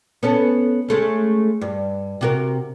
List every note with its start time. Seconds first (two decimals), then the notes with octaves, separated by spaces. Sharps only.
0.23 B3 C#4 A4
0.88 G#3 A3 C#4
1.61 G2
2.21 C3 F#4 A#4